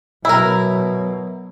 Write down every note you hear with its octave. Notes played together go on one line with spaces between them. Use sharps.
B2 F#3 E4 A#4